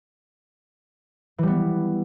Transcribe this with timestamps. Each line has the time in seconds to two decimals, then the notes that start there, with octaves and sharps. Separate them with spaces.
1.38 E3
1.43 G3
1.48 B3